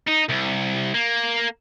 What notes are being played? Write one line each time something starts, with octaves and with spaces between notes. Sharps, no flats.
D#4
C2
A#3